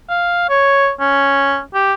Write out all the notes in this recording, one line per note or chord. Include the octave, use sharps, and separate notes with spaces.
F5
C#5
C#4
G4